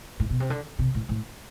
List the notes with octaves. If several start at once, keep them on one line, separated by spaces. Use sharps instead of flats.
A2
B2
C3
D3
C3
A2
A2